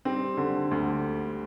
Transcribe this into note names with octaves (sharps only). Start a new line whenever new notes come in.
G3 C4
D3
D2